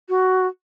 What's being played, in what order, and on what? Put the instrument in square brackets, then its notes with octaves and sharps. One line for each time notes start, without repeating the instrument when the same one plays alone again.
[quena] F#4